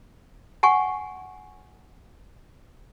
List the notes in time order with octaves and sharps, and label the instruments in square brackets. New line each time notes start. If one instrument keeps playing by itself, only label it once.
[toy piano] F#5 G#5 C#6